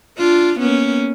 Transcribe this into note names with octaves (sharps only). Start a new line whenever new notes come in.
D4 F4
A#3 B3 C#4